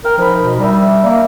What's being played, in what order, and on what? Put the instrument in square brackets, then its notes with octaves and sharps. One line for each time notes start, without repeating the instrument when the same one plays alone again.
[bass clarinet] A#4 [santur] G5
[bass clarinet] F3 [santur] D#4 A#4 B5
[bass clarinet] B2
[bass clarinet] G3 [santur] D4 A#4 E5
[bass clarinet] A#3